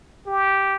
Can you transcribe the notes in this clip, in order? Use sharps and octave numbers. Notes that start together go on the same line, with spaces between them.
G4